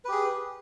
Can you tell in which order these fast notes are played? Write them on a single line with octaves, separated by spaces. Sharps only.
B4 G4 G#4